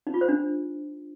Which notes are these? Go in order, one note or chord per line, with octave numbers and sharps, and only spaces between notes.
D#4
F4
C5
D4